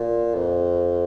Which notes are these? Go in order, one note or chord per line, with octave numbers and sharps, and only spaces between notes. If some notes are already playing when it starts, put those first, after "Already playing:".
Already playing: A#2
F2